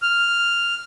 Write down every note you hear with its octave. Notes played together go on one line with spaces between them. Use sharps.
F6